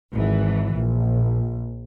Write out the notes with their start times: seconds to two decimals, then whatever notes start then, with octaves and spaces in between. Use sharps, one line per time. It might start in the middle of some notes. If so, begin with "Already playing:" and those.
0.14 G#1 E3
0.74 A#1